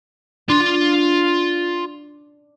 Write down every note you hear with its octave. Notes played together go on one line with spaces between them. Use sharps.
D4 F4 C6